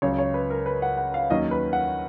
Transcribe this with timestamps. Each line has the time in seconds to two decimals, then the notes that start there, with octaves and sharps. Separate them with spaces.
0.02 C#2 C#3 F#3 C#5
0.18 C#5
0.34 B4
0.50 A#4
0.66 B4
0.82 F#5
0.97 F#5
1.14 F5
1.30 D#2 D#3 F#3 C#4 D#5
1.51 B4
1.73 F#5